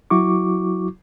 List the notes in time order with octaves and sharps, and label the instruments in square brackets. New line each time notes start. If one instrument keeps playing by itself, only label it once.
[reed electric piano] F#3 E4 F#4 C#6 D6